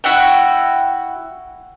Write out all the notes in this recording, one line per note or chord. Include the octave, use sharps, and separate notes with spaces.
E4 F#4 F#5 G5